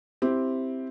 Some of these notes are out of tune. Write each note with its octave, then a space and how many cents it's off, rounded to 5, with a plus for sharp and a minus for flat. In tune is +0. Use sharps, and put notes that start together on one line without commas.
C4 +0 E4 +0 G4 +0